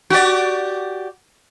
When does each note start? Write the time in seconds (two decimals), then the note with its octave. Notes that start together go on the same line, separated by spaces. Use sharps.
0.10 F#4 G4 D5